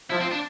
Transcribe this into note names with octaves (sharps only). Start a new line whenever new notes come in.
F3 E4
C4
D4